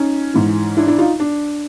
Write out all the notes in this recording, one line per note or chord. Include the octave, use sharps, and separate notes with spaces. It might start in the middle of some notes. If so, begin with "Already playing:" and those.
Already playing: C#4 D#4
G#2 E3
D4 E4
D4 E4
D#4 F4
D4